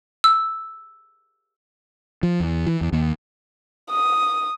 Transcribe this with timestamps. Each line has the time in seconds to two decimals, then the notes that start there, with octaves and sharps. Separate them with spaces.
0.24 E6
2.23 F3
2.40 E2
2.67 E3
2.81 E2
2.93 D#2
3.89 D#6